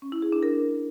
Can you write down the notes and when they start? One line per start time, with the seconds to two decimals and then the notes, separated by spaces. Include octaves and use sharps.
0.02 C#4
0.12 E4
0.22 G#4
0.32 D4
0.43 A#4